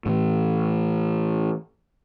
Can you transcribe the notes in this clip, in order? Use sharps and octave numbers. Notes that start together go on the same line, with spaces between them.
A2 E3